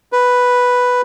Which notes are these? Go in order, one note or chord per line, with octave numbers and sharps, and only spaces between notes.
B4